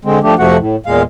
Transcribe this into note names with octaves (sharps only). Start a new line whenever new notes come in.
D3 G#3 C4
F3 A3 D4 G4
F2 C3 F3 A3 F#4 F#5
A2
E2 A#2 G#3 F5